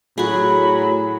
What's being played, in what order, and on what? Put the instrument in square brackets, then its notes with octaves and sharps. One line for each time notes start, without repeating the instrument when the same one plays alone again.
[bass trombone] A2 [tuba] F#3 [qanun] F#4 G#4 [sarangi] B5